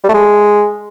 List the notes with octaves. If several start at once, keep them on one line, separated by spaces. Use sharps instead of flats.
G3
A3
G#3